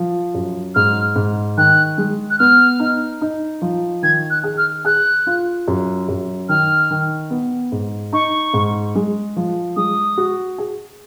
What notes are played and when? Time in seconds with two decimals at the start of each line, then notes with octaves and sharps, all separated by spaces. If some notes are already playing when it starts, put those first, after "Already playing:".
Already playing: F3
0.34 F#2
0.75 G#2 F6
1.16 G#2
1.57 D#3 F#6
1.98 G#3
2.30 F#6
2.39 B3 F6
2.80 D#4
3.21 D#4
3.62 F3
4.03 D#3 G#6
4.30 F#6
4.44 G#4
4.58 F6
4.85 G#4 F#6
5.27 F4
5.68 F#2
6.09 F#2
6.49 D#3 F6
6.91 D#3
7.30 B3
7.72 G#2
8.13 D#4 C#6
8.54 G#2
8.95 G#3
9.37 F3
9.76 G#3 D#6
10.18 F#4
10.58 G#4